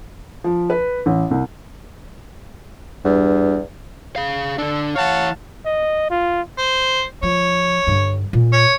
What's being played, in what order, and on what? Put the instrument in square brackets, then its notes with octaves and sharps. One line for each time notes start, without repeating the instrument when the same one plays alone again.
[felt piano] F3
B4
A1
C2
[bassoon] E2 [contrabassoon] G2
[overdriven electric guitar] G#4 F5
[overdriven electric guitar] D3 D4 [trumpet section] A4
[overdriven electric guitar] E3 C#5 [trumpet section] F5 F#5 A5
[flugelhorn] D#5
F4
[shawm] C5
[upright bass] F3 [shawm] C#5
[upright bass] G2 D3
A#2
[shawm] C#5